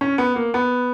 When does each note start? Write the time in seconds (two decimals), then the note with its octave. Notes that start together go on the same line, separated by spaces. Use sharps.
0.01 C#4
0.18 B3
0.36 A#3
0.54 B3